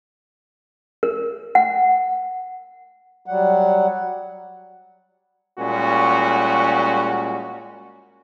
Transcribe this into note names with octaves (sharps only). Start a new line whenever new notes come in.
A#4
F#5
F#3 G3 F#5
A#2 G3 G#3 C#4 F#4